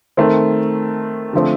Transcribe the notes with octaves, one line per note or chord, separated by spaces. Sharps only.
D#3 A3 C4
D3 F3 A3 C4